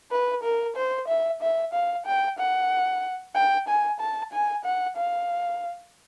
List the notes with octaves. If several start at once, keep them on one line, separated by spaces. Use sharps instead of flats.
B4
A#4
C5
E5
E5
F5
G5
F#5
G5
G#5
A5
G#5
F#5
F5